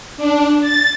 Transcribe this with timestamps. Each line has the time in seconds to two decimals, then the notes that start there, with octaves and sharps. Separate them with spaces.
0.17 D4
0.61 A6